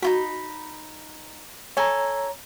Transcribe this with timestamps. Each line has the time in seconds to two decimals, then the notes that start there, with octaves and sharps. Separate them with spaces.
0.02 D#4 F4 F#4 B5
1.77 A4 C#5 G#5 A#5